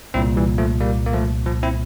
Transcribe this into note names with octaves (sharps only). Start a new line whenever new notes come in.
C2 A#2 C4 E4
E3 G3
F3 A3
G3 A#3
A#3
F3 A3
F3
C4 E4